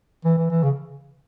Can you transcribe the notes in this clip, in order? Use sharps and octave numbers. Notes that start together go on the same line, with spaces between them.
E3
E3
E3
C#3